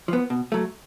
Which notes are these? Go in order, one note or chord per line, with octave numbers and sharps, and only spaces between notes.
F3 B3
B2
F#3 A3